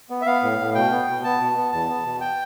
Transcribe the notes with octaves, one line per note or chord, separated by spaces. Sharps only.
B3
E5
B3 F5
A2
A2
B2 G5
B3
B2
B3 A5
B2
B3
E2 A5
B3
B2
G5